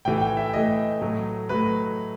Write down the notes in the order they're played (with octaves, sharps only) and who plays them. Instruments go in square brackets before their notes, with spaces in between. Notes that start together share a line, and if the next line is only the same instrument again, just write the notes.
[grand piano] A2 E3 A3 G5
G5
E5
A2 E3 A3 D#5
A2 F#3 A3
A2 F#3 A3 B4